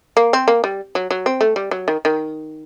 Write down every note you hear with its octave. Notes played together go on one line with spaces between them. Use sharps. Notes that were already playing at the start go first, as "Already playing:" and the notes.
A#3
C4
A#3
G3
F#3
F#3
C4
A3
G3
F#3
D#3
D#3